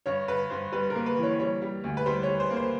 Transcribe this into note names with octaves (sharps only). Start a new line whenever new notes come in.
G2 C#5
G2 B4
G2 C5
G3 B4
A#4
A#3
B4
E3 C#5
G3 C#5
G3
D2
B4
G3 C5
G3 C#5
C5
A#3
C5